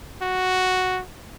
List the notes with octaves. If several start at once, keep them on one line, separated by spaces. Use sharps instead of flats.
F#4